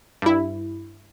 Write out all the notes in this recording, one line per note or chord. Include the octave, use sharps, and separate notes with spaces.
G2 E4